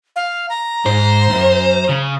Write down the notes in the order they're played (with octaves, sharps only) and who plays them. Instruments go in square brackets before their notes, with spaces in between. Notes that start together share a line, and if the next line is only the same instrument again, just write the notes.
[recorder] F5
A#5
[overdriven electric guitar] G#2 [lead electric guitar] C5
[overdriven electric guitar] C2 F#2
C#3